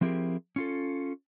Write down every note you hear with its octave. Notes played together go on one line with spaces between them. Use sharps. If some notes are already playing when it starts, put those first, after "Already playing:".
F3 C4 E4 G4 G#4 A#4
C#4 F4 A4